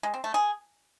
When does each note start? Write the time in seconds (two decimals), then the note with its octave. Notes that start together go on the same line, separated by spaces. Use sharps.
0.03 G#3
0.14 C4
0.24 A3
0.34 G#4